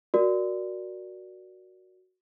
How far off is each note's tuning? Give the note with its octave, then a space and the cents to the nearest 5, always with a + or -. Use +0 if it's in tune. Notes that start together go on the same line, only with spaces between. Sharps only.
F#4 +0 A#4 +10 D5 +0